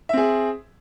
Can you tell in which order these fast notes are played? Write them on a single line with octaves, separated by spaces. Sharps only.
E5 C4 G#4